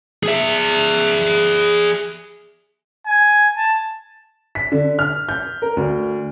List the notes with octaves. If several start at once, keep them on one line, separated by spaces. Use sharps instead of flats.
G#4 E5
G#5
A5
B6
D3
F6
G6
A#4
D2